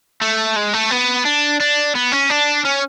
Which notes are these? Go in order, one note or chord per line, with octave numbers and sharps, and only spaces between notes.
A3
G#3
A3
B3
D4
D4
B3
C#4
D4
C#4